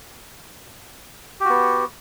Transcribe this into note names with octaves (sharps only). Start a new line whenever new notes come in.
B3 F#4 G4